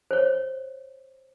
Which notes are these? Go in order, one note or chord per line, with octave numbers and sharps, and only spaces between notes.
C5 C#5